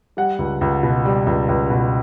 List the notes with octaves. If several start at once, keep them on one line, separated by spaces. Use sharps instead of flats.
G3 F#5
C#2
C#2
B2
G3
C#2
C#2
B2